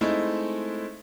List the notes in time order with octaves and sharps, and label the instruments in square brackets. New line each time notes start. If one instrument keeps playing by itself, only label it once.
[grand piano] G#3 A3 C4 D#4 E4